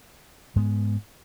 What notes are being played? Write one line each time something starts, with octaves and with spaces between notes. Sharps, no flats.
G#2 G#3 B3